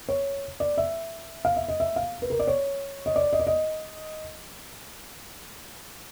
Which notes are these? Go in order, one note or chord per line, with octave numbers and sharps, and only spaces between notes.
C#5
D5
E5
F5
E5
D#5
E5
F5
B4
A#4
D5
C#5
D#5
D5
D#5
D5
D#5